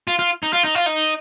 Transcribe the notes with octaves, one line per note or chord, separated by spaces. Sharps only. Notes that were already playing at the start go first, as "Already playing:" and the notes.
F4
F4
D#4
F4
D#4
F4
D#4